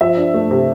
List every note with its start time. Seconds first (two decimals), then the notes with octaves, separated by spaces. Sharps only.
0.01 F3 E5
0.17 D4
0.34 A3
0.51 C3